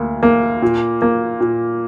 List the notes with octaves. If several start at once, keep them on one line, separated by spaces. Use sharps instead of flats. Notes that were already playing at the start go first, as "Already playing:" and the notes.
Already playing: D2 A#3
A#3
A#2
A#3
A#2